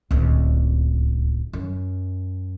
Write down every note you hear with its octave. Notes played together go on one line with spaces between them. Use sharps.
D1 C#2
F#2